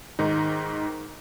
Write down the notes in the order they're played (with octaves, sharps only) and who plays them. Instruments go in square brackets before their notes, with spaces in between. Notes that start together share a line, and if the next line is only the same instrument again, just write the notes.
[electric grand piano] G#2 D#3 D#4